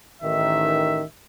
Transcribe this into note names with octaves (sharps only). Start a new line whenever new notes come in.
A1 D#3 E5